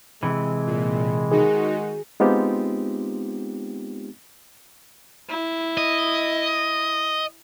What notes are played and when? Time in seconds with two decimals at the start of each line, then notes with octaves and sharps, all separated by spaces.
0.23 C3 E3 G#3
0.67 A#2
1.32 D#3 D#4 F#4 G#4
2.20 G#3 B3 C4 D#4 F4 G4
5.29 E4
5.78 D#5